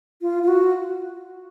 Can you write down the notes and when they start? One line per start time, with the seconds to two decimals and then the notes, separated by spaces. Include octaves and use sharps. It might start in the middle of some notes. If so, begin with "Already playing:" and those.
0.22 F4
0.43 F4
0.48 F#4